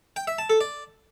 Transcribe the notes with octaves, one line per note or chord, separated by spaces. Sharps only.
G5
E5
A5
A4
D5